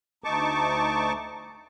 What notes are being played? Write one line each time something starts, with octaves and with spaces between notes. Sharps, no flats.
D2 D#4 A5 C#6 D6